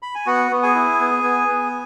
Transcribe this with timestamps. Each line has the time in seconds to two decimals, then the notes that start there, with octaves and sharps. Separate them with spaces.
0.02 B5
0.15 G#5
0.26 B3 F#4 F#5
0.52 B3
0.63 G#4 G#5
0.75 E4
1.00 B3
1.24 B3
1.48 B3